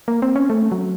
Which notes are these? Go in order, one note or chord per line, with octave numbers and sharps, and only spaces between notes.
A#3
C4
C#4
A3
F#3